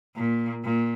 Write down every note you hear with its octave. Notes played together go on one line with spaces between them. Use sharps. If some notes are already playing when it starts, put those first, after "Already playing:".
A#2
A#2